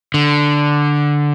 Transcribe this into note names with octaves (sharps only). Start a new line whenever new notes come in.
D3